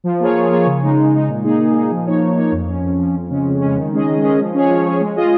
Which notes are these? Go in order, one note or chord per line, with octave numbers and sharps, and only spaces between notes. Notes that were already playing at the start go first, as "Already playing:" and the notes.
F3
A#3 F4 G#4 C#5
F3
A#3 F4 G#4 C#5
C#3
G#3 D#4
C#3
G#3 D#4
A#2
A#3 D#4 G#4
A#2
A#3 D#4 G#4
F3
A#3 D#4 C#5
F3
A#3 D#4 C#5
F2
F3 C#4
F2
F3 C#4
F2
C#3 G#3 C#4
F2
C#3 G#3 C#4
D#3
G#3 C#4 G#4 D#5
D#3
G#3 C#4 G#4 D#5
F3
C#4 G#4 C#5
F3
C#4 G#4 C#5
G#3
F4 G#4 D#5